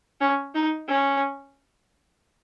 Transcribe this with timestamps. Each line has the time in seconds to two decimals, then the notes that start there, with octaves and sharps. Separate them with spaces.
0.21 C#4
0.55 D#4
0.88 C#4